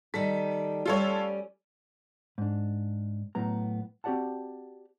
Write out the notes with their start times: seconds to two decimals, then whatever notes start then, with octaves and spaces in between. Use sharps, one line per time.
0.14 D#3 G3 A4 B6
0.86 G3 A3 C#4 F4 A4 C#5
2.38 G#2 D4
3.35 A2 F#3 B3 A#5
4.04 C4 F#4 G4 D5 F#5 A5